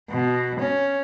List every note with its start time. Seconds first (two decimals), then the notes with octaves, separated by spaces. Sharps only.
0.10 B2
0.61 C#4